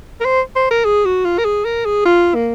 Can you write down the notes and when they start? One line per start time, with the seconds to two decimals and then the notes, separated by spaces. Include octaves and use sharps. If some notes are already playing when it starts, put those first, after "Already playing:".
0.20 A#4
0.25 C5
0.55 C5
0.71 A#4
0.85 G#4
1.05 F#4
1.25 F4
1.38 A#4
1.45 G#4
1.64 A#4
1.85 G#4
2.05 F4
2.35 A#3